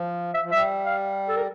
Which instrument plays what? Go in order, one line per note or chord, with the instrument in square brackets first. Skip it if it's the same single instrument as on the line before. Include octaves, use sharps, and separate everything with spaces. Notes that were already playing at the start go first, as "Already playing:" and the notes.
Already playing: [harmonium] F3
[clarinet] E5
[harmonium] F3
[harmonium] G3 [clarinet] E5
[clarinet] F5
A4
A#4